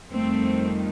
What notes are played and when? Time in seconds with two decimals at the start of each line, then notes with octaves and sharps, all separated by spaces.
0.12 F2 D#3 G3 A3 C4